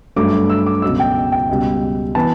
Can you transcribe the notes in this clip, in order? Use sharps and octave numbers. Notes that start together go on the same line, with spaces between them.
G2 F#3 A3 D6
E6
D6
C#2 B2 F#3 E6
G5
G5
C#2 B2 G3
E3 B3 A5